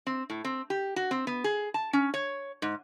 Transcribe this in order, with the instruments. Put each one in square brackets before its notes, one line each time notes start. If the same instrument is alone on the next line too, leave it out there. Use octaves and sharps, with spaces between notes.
[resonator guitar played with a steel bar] C4
A2
C4
G4
F#4
C4
B3
G#4
A5
C#4
C#5
G#2